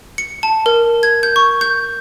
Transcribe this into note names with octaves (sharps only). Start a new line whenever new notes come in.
C#7
A5
A#4
G#6
G6
C#6
G6